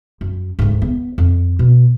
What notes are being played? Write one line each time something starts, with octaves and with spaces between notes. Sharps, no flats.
F#2
D2 G#2
B3
F2
B2